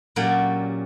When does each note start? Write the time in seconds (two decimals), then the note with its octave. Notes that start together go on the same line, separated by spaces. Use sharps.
0.16 A#2 F#3 C#4 G4 D5